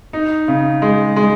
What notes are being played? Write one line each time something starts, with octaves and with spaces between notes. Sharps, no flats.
D#4
C#3
G#3
G#3